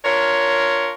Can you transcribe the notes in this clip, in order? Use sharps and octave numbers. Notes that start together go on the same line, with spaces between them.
D4 F4 A#4 C#5